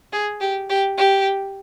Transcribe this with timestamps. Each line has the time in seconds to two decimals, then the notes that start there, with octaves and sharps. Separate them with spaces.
0.13 G#4
0.41 G4
0.70 G4
0.98 G4